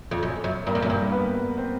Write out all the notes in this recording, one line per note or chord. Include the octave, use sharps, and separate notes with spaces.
F2
F#2
F#2
G2 A#3 A#4
F2
F#2
G2
B3 B4
C4 C5